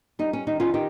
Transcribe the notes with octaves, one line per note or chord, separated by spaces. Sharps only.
G3 D#4
C#4
D#3 D#4
C#4 F4
D#3 D#4 G4